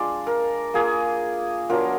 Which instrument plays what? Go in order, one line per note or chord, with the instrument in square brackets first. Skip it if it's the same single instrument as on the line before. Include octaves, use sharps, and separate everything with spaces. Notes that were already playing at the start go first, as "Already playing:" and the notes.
Already playing: [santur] G#3 D4 F4 D5
A#4
A#3 F4 G#4
F#3 B3 D4 F4 A#4